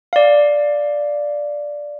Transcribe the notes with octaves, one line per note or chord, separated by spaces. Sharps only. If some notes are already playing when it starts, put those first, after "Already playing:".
D5 F5